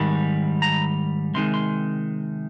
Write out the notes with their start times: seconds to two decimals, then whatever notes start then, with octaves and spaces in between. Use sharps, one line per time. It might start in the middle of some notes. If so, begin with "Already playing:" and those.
Already playing: G#2 D#3 G3
0.62 A#5
1.34 C3 D#3 G#3 C6
1.54 C6